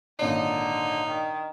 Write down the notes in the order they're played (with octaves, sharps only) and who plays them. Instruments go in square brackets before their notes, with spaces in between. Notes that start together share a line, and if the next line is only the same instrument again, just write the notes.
[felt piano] G#1 A#2 C#5 [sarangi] D3 [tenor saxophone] D#4
[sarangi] D#3